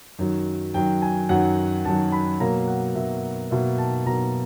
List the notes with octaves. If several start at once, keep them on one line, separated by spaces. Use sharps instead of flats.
F#2 D#3 F#3
F#2 D#3 F#3 G5
G#5
F#2 D#3 F#3 F#5
F#2 D#3 F#3 A5
B5
B2 F#3 A#3 A#5
F#5
B2 F#3 A#3 E5
B2 F#3 A#3 E5
A5
B2 F#3 A#3 A#5